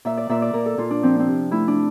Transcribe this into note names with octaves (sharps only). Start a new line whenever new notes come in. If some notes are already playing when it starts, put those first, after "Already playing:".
A#2 E5
D5
A#2 E5
D5
A#2 A#4
A4
A#2 F4
D4
F3 C4
C4
C3
A3 E4
D4